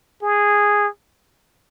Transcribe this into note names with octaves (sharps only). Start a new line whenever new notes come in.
G#4